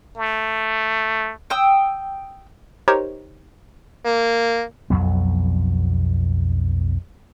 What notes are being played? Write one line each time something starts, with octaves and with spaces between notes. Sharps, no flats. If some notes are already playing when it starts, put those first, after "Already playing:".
A3
G5 D#6 E6
D#4 G4 A#4 C5 C#5
A#3
B1 F2 F#3 B3